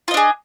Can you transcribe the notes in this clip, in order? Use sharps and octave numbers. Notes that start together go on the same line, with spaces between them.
D4 F4 G#4 D#5